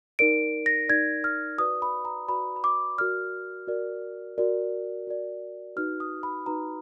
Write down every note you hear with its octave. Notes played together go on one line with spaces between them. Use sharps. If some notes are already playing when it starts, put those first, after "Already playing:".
D#4 A#4 D5 D7
A#6
D#4 A#4 D5 G#6
F6
F#4 B4 D5 D#6
B5
A#5
F#4 B4 D5 B5
B5
D6
F#4 A#4 D5 F6
F#4 A#4 D5
F#4 A#4 D5
F#4 A#4 D5
D#4 F#4 B4 F6
D#6
B5
D#4 F#4 B4 A#5